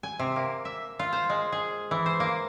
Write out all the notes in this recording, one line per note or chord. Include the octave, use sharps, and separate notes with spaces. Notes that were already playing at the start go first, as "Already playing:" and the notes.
G#5
C3
A#3
E5
F4
C5
G#3
G#4
E3
C5
A#3